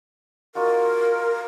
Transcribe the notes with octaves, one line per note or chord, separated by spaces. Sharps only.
D#4 F4 F#4 A#4